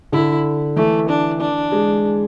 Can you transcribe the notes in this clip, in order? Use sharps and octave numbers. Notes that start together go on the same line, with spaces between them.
D3 E4
E3 A3
D4
D4
G#3